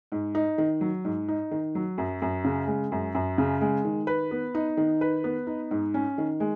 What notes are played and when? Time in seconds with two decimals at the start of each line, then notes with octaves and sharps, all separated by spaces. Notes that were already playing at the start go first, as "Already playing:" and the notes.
0.12 G#2
0.35 D#4
0.58 D#3
0.81 F#3
1.05 G#2
1.28 D#4
1.51 D#3
1.75 F#3
1.98 F#2
2.22 F#2
2.44 C#3
2.67 G#3
2.92 F#2
3.15 F#2
3.38 C#3
3.61 G#3
3.85 D#3
4.07 B4
4.31 B3
4.55 D#4
4.77 D#3
5.01 B4
5.24 B3
5.47 D#4
5.71 G#2
5.94 C#4
6.18 D#3
6.40 G#3